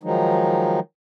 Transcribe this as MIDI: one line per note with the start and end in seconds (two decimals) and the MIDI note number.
0.03 0.80 51
0.03 0.80 53
0.03 0.80 54
0.03 0.80 56
0.03 0.80 63